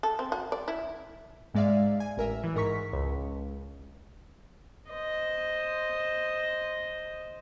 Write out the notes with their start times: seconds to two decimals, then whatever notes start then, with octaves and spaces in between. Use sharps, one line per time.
0.03 A4
0.19 C4
0.32 F#4
0.52 D5
0.68 E4
1.54 G#2 G#3 D5 E5 F5
2.00 G#5
2.17 A1 A#4 E5
2.44 E3
2.56 G#2 A#4 A#5 C#6 B6
2.93 C#2
4.90 C5 D#5